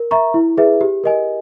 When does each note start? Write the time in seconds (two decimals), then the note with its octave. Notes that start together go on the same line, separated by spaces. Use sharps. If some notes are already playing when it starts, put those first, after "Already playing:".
Already playing: A#4
0.11 E5 A#5 C#6
0.34 E4
0.57 G#4 B4 E5
0.81 G4
1.04 A#4 D#5 G#5